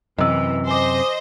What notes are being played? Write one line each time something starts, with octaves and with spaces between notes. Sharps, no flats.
F#2 C3 E3 D#5 E6
C5 D#5 G#5 D6